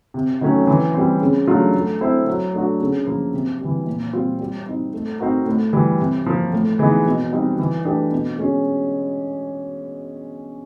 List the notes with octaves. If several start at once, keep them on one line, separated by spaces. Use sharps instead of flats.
C3
D#3 F#3 A3 C#4
E3
G3 C4
C#3
F#3 A3 D4 F4
A3
C4 E4 A4 C5
F#3
A3 D4 F#4
C#3
F3 A#3
C3
E3 G3
A#2
G3 C4 F4
G3
C4 D#4
A3
C4 D#4 F#4 A#4
A2
E3 G3
C3
F3 A#3
A2
E3 G#3 B3 D#4
B2
G3 C4 D#4
E3
A3 D4 G4 B4
B2
G#3 C#4